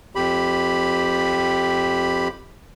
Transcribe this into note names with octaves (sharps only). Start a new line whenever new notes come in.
F2 G4 B5